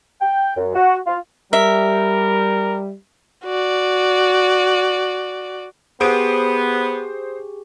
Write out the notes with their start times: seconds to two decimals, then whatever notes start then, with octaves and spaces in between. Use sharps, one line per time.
0.20 G5
0.56 F#2
0.75 F#4
1.06 F4
1.53 G3 A#4 E5
3.45 F#4 D5
6.01 B3 G4 G#4 C5 D#6 D7